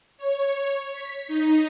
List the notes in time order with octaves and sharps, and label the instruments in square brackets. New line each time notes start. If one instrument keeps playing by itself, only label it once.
[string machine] C#5
B6
D#4